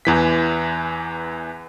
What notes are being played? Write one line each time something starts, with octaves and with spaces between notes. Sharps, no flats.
E2 E3 B6